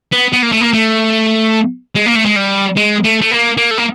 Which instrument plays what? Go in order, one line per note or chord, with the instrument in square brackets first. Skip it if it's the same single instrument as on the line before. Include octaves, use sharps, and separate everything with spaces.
[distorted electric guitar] B3
B3
A#3
A3
A#3
A3
G#3
A#3
A3
G#3
G3
G#3
A3
A3
A#3
A#3
A3
A#3